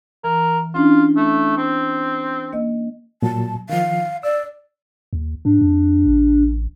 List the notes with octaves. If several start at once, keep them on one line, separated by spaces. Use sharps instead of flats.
E3 A#4
C#4 D4 E4 F4
A3
C4
A#3 D#5
A#2 F#3 A5
D#3 F3 F5
D5 E6
D#2
G#2 D4
F2
A1